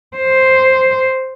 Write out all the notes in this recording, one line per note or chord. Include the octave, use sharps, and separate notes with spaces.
C5